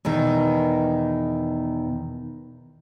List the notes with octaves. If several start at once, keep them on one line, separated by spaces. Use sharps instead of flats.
E2 B2 D#3 A#4